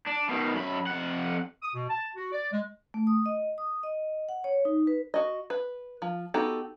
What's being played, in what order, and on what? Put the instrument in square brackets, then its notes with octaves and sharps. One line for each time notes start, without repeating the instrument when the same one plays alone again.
[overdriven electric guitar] D4
B2 D#3
F#2 B5
F2 F#5
[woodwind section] D#6
B2
A5
F#4
D5
G#3
[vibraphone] A3
D#6
D#5
D#6
D#5
F#5
C#5
D#4
B4
[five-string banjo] F#4 D#5
B4
F3
B3 D#4 F#4 G4 A4